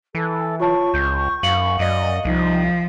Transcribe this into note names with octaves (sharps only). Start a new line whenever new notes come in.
E3 A4
F4 C#5 A5 C#6
C#2 G6
F#2 F5 C#7 F#7
F#2 D5 D#5
C2 F3 D#4